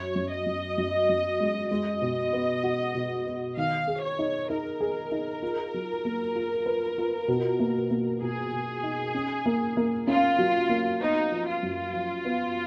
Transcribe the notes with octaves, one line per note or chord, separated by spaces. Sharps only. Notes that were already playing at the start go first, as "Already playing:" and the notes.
Already playing: F#2 C#5
F#2
D#5
F#2
F#2
F#2
G#3
G#3 D#5
B2
B3
F#4
B2
B3
D#3 F5
G#4
C#5
D#4
D#4 A#4
G#4
D#4
F4
F#3
A#3
F4
B4
F4
B2
A#3
A#3
B2 G#4
B2
D#4
C#4
A#3
A#3
C#4 F4
F#3
A#3
B3 D#4
F3
F4
F#2
F3
B3